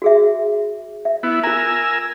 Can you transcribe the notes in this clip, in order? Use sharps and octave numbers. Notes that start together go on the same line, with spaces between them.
F#4 G#4 E5
E5
B3 E4
F4 A#4 G#5 A#5 E6